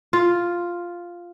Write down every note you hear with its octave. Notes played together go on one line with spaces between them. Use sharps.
F4